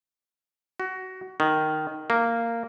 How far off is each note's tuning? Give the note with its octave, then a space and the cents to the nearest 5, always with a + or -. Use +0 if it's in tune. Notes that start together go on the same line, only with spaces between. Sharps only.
F#4 +20
D#3 -5
A#3 -10